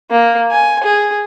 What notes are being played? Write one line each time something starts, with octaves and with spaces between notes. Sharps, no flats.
A#3
G#5
G#4